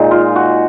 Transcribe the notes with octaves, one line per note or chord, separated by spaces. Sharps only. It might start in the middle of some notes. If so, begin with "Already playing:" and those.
Already playing: A#2 G#3 D#4
F4
F#4